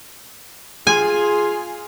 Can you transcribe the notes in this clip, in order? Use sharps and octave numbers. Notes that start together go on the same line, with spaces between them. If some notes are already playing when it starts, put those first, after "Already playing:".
F4 G#4 G#5